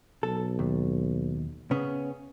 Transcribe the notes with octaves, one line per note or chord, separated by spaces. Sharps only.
B1 A4
D#2
C#3 B3 C#4